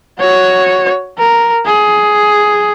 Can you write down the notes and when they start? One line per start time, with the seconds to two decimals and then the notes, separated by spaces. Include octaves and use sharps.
0.19 F#4 C#5
1.18 A#4
1.65 G#4